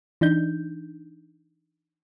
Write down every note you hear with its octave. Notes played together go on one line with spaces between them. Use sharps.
E3 D4 D#4 G6